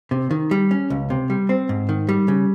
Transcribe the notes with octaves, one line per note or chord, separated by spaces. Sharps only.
C3
D#3
G3
C#4
C#2
C3
G3
C4
G#2
D#3
G3
C#3